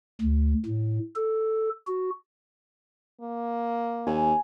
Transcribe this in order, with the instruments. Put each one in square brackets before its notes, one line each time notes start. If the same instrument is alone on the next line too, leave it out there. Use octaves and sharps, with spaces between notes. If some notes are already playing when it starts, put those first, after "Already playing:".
[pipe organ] D2
A2
A4
F#4
[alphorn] A#3
[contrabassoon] D#2 [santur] G#5